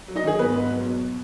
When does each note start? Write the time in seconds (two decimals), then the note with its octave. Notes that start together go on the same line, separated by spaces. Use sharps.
0.08 F#3
0.15 D#4 D#5
0.24 D#3 G#4
0.39 G#1 B3 B4
0.55 G#2
0.70 F#3
0.86 B2